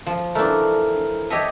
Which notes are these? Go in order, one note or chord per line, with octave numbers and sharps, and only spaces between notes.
F3
E3 A3 D4 A#4
G4 A4 C#5 D#5 E5